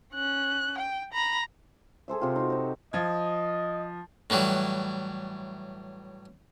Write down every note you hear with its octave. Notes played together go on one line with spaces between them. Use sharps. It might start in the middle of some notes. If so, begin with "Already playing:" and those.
C#4 F#6
G5
A#5 B5
G#4 A4 C5 E5
C3 F4 G5
D#4 F#4
D#4 C5
F3 D#5 G#6
A2 E3 F#3 G3